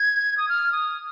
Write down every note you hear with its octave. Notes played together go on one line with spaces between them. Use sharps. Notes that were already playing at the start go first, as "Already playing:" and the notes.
Already playing: G#6
D#6
F6
D#6